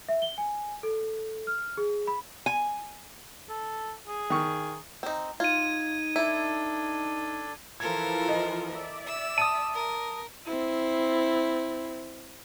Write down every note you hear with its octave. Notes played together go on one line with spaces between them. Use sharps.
E5
G7
G#5
A4
F6
G#4
B5
G#5
A4
G#4
D#3 C#6
C4 D#4
D#4 F4 G#6 D#7
D4 E4 A4
E3 F3 F4 A4 A#4 G#6
D#5
D5 E5
E6
A5 D#6 D#7
A#4
C4 E4